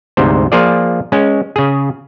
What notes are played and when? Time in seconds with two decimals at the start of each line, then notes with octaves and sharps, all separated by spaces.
0.17 D2 G#2 C3 C5
0.52 F3 A#3 F4 G#4 D5
1.12 G#3 C#4
1.56 C#3 G#4